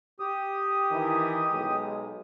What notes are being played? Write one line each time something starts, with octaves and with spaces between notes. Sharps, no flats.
G4 D#6
D#3 E3 E4
B1 G#3